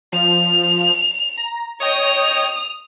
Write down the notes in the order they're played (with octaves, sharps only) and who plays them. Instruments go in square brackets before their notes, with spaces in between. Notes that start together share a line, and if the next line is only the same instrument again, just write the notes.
[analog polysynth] F3 [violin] F7
[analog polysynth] A#5
[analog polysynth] C#5 D#5 G5 [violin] D#6 F7